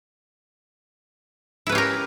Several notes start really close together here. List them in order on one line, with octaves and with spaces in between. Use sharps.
E4 B4 C#4 G4 A#4